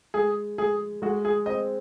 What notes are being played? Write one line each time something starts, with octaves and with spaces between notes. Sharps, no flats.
G#3 G#4
G#3 G#4
G#3 F#4
G#4
C4 D#5